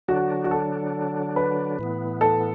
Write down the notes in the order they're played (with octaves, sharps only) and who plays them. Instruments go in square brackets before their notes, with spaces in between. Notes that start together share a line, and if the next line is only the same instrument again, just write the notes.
[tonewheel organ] D3 F#3 D4 [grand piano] F#4
[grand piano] F#4
A4
B4
[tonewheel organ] A2 E3 B3
[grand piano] A4